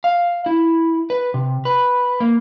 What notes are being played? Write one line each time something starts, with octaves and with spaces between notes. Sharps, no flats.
F5
E4
B4
C3
B4
A#3